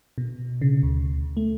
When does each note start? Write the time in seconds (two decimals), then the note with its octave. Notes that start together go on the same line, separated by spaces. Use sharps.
0.18 B2
0.61 C#3
0.83 D2
1.37 A3